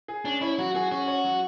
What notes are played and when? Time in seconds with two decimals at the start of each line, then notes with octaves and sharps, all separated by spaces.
0.08 G#4
0.25 C#4 D4
0.41 E4 C#5
0.59 F#3 F#4
0.75 F#4 G#4
0.91 C#4 F#4
1.08 C#5
1.24 F#3